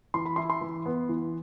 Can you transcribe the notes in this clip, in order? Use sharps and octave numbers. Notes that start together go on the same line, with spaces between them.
E3 C6
B5
E4 C6
C6
E3
B3
E3